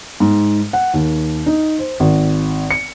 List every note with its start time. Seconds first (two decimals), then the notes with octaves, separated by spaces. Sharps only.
0.20 G#2
0.73 F#5
0.94 D#2
1.46 D#4
1.79 C5
2.00 G#1
2.71 C#7